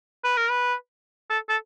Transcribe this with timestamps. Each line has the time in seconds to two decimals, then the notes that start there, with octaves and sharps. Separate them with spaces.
0.24 B4
0.37 A#4
0.50 B4
1.30 A4
1.49 A4